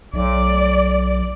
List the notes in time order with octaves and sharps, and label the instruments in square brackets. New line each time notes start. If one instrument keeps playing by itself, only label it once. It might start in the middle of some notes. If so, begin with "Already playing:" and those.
[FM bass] B1 [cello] D5